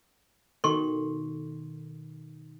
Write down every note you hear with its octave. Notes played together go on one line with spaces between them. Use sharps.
B2 D#3 A4 C6 C#6